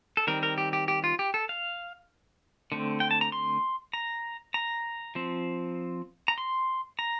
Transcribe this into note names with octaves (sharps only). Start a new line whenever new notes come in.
A4
D#3 G3 C4 A#4
A#4
G4
G4
G4
F4
G4
A4
F5
D3 A3 C4
G5
A5
A#5
C6
A#5
A#5
F3 C4
A#5
C6
A#5